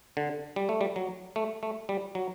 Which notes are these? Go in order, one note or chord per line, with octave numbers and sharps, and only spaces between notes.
D3
G3
A3
G3
F#3
A3
A3
G3
F#3